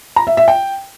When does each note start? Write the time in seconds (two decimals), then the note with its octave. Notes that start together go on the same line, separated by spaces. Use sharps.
0.16 A#5
0.27 E5
0.37 E5
0.48 G5